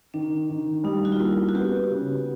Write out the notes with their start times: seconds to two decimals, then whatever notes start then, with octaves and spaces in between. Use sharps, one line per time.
0.14 D#3 D4
0.50 D#3
0.84 G3 D#4
1.05 F#4
1.12 F4
1.19 A#3 E4
1.49 F#4
1.55 B3 G4
1.90 C#3